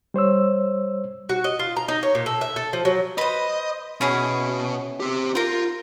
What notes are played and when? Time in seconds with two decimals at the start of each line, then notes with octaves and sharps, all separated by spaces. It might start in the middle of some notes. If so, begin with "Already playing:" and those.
0.14 G3 C5 C#5 E6
1.29 F#4
1.44 D#5
1.59 F4
1.77 A#5
1.88 D#4
2.03 C#5
2.15 A#2
2.26 A4
2.41 E5
2.56 A4
2.73 F3
2.85 F#3
3.18 B4 C5 D#5
4.01 B2 C#4 E4 G#4
5.00 C4 G4
5.35 F4 A#4 C5